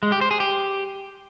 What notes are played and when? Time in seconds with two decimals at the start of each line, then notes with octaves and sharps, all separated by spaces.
0.03 G#3
0.12 G4
0.21 C5
0.31 G#4
0.40 G4